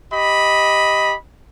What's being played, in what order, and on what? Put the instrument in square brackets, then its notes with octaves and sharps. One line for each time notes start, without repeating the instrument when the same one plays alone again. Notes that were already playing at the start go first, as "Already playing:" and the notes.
[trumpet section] G4 D#5 B5